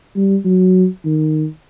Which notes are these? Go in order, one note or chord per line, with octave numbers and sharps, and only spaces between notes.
G3
F#3
D#3